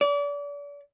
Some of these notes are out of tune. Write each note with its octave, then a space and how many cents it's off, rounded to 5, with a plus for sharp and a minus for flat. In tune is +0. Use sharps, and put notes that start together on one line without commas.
D5 -35